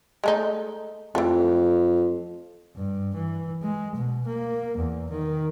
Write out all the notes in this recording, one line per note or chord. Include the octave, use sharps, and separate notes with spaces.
G#3 A3 D#4
F2 E3 G3 A3
G2
E3
G#3
B2
A#3
E2
D#3